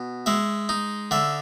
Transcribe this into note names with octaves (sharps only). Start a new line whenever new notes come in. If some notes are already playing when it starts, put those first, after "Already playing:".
Already playing: B2
G#3 E5
D#4
D3 E5